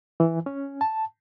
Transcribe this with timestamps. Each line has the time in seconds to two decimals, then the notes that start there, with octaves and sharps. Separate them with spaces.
0.20 E3
0.46 C#4
0.81 A5